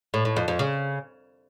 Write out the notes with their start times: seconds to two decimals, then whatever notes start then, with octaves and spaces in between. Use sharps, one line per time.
0.14 A2
0.25 A2
0.37 F2
0.48 F2
0.59 C#3